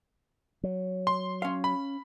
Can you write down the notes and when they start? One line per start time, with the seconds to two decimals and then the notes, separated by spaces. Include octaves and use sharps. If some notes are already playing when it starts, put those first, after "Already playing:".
0.63 F#3
1.07 C6
1.42 C#4 F5
1.64 B5